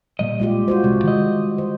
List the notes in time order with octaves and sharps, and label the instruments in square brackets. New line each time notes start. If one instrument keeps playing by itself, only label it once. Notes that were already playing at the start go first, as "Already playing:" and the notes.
[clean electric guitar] A#2 D#3 D#5 [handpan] G3
[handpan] G#3 F4 G4
F4 F#4 C5
[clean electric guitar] C2 [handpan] G#3
[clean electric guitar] D#3 D#5
[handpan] C5